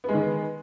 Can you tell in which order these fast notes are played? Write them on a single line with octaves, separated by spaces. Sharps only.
B3 G#3 D#3